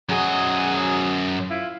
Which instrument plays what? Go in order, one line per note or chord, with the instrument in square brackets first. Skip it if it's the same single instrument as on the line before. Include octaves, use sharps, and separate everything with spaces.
[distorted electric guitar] F#2 D#5 [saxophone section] F#3 G#4
[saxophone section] E4 F4